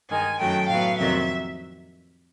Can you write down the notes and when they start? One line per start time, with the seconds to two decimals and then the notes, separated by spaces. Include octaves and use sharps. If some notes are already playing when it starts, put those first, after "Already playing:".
0.10 G2 D#3 G#3 G#5
0.40 F#2 D#3 F#3 A3 G5
0.69 A2 F#3 B3 F5
0.98 F2 C3 D#3 F#3 A#3 E5